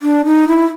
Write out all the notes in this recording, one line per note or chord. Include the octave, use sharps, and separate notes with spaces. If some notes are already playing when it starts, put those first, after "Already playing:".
D4
D#4
E4